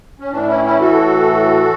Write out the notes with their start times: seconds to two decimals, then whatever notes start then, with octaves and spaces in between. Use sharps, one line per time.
0.20 C#4
0.31 A2 E3 D4
0.48 C#4 E4
0.64 C#4 E4
0.81 F#4 A4